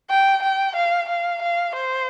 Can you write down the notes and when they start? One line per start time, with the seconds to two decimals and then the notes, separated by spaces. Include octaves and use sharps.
0.10 G5
0.42 G5
0.76 F5
1.09 F5
1.42 F5
1.75 C5